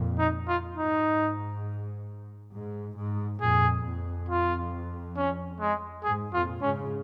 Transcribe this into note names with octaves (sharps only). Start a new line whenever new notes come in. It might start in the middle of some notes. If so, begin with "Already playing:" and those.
Already playing: F2 A#2
D#4
F4
G#2 D#4
G#2
G#2
F2 A#2 G#4
F2
F4
C#4
G#3
G#2 G#4
F2 A#2 F4
G#2 C#3 C#4